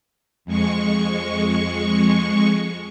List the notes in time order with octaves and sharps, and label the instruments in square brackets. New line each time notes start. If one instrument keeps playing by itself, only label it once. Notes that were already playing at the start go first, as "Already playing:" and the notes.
[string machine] F2 G#3 C#6